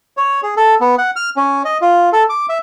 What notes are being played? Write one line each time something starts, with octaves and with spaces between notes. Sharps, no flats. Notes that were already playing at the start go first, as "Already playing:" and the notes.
C#5
G#4
A4
B3
F#5
F6
C#4
D#5
F4
A4
D6
E5